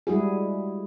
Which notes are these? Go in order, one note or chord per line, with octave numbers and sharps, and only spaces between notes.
G3 G#3 E4 F#4 G#4